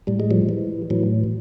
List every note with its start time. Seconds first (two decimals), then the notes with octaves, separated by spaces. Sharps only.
0.07 A2 G3
0.20 G#3
0.31 F3 G3
0.49 E3
0.90 A2 E3 F#3